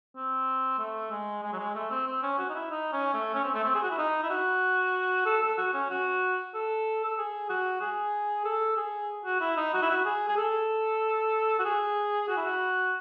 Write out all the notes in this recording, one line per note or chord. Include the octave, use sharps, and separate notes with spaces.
C4
A3
G#3
G#3
F#3
G#3
A3
C4
C4
C#4
F#4
D#4
E4
D#4
C#4
A3
C#4
C4
A3
C4
G#4
F#4
E4
D#4
E4
F#4
A4
A4
F#4
C#4
F#4
A4
A4
G#4
F#4
G#4
A4
G#4
F#4
E4
D#4
F#4
E4
F#4
G#4
G#4
A4
F#4
G#4
F#4
E4
F#4